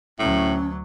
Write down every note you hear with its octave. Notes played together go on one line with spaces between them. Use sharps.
D2 A2 F#3 C#4